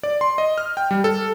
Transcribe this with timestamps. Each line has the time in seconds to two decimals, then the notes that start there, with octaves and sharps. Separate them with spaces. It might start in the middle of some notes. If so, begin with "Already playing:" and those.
0.03 D5
0.21 C6
0.38 D#5
0.58 F6
0.77 G5
0.91 G3
1.04 A4